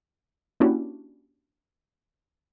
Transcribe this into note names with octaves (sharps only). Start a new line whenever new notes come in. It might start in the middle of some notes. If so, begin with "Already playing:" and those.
A#3 C#4 D4 E4 F#4 G4